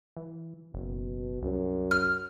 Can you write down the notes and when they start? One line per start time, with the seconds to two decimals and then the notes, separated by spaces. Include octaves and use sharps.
0.17 E3
0.74 F#1 B2
1.42 C2 F#2
1.91 F6